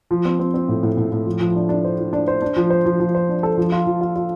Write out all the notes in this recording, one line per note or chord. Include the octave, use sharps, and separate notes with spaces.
F3
C4
C4
C4
A2
A2
A2
A2
F3
F3
D4
D4
C5
F3
D4
C5
D4
F3
C5
F3
F3
C5
D4
A4
F3
F4
F3
F4
F4